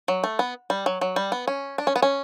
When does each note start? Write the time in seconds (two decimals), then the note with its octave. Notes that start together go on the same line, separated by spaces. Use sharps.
0.08 F#3
0.24 A3
0.39 B3
0.70 G3
0.86 F#3
1.01 F#3
1.16 G3
1.32 B3
1.48 C#4
1.78 D4
1.87 C#4
1.96 B3
2.02 C#4